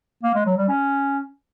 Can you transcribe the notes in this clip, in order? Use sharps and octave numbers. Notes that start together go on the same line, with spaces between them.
A#3
G#3
F#3
G3
C#4